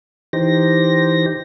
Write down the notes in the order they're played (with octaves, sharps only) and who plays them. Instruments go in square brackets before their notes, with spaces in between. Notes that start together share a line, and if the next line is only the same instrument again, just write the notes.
[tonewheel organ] E3 D#4 G4 C5 A#6